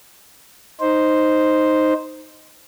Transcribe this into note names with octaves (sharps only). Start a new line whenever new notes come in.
D#4 C5